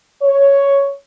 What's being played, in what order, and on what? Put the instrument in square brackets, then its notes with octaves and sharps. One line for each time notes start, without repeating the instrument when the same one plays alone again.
[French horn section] C#5